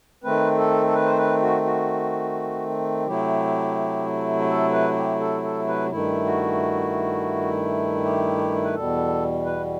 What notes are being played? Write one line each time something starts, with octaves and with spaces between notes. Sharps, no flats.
D#3 A3 C4 B4
A4
A4
B4
C5
B4
F#4
F#4
C3 F#3 A3 E4 G4
A4
B4
G4
A4
A4
B4
G2 D#3 A3 E4
F#4
G4
B4
E2 B2 G3 A4
B4